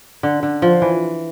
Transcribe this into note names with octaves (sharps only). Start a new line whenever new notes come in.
D3
D3
F3
E3